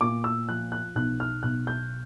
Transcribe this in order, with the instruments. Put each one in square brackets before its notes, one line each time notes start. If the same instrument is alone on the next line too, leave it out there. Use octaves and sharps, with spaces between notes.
[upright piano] A#2 D6
E6
F3 F#6
F#6
B1 F#6
F6
B1 F#6
G6